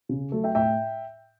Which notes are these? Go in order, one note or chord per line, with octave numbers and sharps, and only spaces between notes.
C#3
F#3 A3 A4
E5 G5
A2 E5 G5